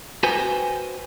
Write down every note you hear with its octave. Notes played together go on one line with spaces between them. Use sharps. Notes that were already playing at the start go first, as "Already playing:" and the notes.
F#4 B4 C5 G5 G#5